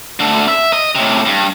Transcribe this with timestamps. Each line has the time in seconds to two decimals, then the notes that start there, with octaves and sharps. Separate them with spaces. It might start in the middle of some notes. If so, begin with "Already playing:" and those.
0.20 D3 A3
0.48 E5
0.73 D#5
0.95 A2 C3
1.26 G2